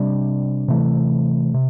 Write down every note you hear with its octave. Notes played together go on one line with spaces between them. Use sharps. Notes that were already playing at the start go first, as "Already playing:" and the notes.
Already playing: C3 G3 D4
C3 E3 A3
C3